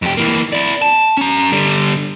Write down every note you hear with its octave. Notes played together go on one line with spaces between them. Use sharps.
F2 G4
E3 A#3
E4 D5
A5
C#4 A#5
D3 G3